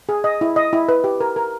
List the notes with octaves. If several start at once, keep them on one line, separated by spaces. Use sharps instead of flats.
G#4
D#5
E4
D#5
E4
B4
G4
A#4
A#4